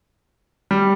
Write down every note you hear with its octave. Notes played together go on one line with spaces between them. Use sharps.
G3